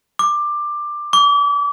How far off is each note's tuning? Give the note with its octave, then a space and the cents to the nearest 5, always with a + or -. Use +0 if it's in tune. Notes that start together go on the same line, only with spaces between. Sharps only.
D6 +15
D6 -35